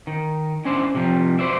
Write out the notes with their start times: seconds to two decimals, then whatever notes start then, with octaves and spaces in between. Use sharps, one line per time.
0.07 D#3
0.65 C#4 D4 E4 C5
0.95 C3 F3 G3
1.39 F#4 B4 C5 D5 E5